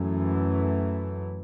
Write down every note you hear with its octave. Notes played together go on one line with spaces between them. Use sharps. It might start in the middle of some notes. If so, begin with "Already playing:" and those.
Already playing: F#2 E3 A3